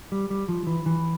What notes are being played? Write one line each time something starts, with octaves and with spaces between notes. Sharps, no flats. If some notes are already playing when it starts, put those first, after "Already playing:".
G3
G3
F3
E3
E3